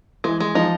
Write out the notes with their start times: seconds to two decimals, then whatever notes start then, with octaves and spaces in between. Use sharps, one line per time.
0.24 E3 G#3
0.40 G#3
0.55 F3 D#4